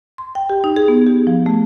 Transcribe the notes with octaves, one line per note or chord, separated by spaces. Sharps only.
C6
G5
G4
D#4
G#4
B3
G4
F3
A3